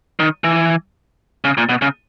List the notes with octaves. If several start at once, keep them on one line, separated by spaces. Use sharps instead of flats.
D#3
E3
C#3
A#2
B2
C#3